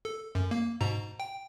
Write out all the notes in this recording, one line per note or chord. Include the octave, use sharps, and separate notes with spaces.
A4
F#2
A#3
G#2 B2 A#5
G5